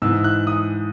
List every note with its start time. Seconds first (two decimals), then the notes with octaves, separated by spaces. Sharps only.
0.02 G#2 E3 E6
0.24 F#6
0.47 D#6